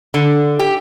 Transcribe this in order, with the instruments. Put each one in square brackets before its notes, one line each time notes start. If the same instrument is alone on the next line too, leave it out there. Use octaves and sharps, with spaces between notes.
[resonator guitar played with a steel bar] D3
G4